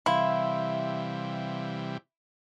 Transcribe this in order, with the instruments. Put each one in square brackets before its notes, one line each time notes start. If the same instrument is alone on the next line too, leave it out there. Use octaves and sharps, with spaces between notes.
[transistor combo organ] C3 E3 G3 [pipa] E4 [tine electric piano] F5 C6